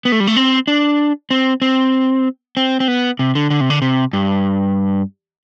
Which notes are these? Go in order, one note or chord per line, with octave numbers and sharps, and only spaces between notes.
B3
A3
G3
A3
C4
D4
C4
C4
C4
C4
B3
C3
D3
D3
C3
D3
C3
G2